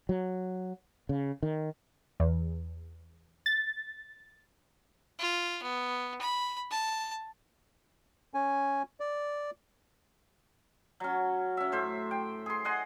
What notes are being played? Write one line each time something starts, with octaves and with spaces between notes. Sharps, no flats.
F#3
C#3
D#3
E2
A6
F4
B3
B5
A5
C#4 G#5
D5
F#3 C#4
C#4 E5
A2 C5 E5
G5
G#4 C6
D#5 F#5 G#5 C6